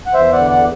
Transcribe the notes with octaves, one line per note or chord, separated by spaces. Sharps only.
F#5
E2 C5 E5
D5 F#5
D3
D5 F#5